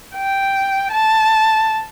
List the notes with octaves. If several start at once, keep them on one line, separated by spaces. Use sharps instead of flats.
G5
A5